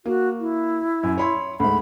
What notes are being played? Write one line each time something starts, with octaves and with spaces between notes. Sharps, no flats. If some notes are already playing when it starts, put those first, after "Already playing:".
A#3 F#4
E4
F#2
C#5 B5 C6
D2 G#2 B5